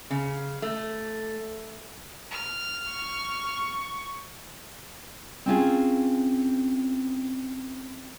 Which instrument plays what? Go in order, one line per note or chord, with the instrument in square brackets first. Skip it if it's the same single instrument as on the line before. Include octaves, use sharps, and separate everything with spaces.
[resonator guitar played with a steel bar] C#3
A3
[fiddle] F6
[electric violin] C#6
[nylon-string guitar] C4 C#4 F4 G#4